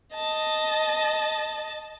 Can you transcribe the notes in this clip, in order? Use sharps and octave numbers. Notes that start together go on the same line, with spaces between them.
D#5 A5